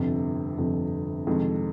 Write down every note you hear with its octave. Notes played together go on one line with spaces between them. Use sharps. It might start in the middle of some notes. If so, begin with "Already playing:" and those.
Already playing: G1 F2 C3
G1 F2 C3
F2 C3 D#3 G#3